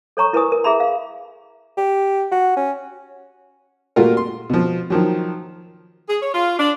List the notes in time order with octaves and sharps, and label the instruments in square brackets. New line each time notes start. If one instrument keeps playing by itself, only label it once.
[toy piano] A4 C#5 A#5 C#6
E4 A#4 B4 G#5 D#6
A#4
G#4 E5 A#5 B5
F5
[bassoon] G4
F#4
C#4
[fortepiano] A#2 G3 A3 F4 F#4 A#4
C6
B2 F3
D#3 F3 F#3
[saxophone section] G#4
C#5
F4
D4